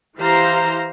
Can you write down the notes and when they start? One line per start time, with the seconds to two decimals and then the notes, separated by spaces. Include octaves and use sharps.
0.19 E3 G4 C5 F5 A#5